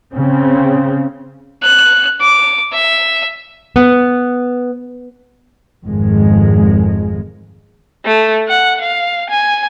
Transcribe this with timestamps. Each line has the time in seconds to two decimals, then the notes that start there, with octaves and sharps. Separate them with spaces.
0.14 C#3 C4
1.62 F#6
2.21 D6
2.73 E5
3.76 B3
5.84 G#1 F2 D#3 G#3
8.05 A3
8.48 F#5
8.81 F5
9.30 G#5